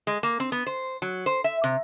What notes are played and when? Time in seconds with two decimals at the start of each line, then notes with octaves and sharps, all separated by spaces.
0.07 G#3
0.23 A#3
0.40 C4
0.52 B3
0.67 C5
1.02 F#3
1.26 C5
1.44 E5
1.64 C3